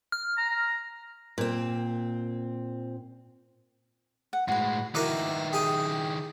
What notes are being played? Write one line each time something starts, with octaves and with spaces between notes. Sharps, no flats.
F6
A#5
A#2 C4
F#5
A2 G#3 F#4 B4
D#3 E3 E4 F#4 A#4 D6
G4 G#4